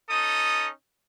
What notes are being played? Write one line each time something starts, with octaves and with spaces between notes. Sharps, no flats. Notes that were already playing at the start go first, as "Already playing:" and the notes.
C#4 D#4 A4 D#6